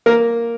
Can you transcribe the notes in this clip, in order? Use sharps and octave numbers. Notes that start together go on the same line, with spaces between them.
A#3 A#4